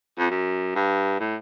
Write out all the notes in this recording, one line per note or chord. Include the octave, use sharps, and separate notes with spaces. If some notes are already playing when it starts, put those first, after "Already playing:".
F2
F#2
G2
A2